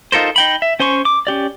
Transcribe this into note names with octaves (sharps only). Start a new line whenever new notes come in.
D#4 F4 A4 A#4 C5
D#4 G5 B5
E5
C#4 C5 G#5 C6 C#6
D6
C#4 G4 D5